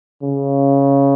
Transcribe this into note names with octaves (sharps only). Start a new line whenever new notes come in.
C#3